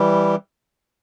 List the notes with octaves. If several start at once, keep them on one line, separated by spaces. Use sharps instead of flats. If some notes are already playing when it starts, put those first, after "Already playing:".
Already playing: E3 G3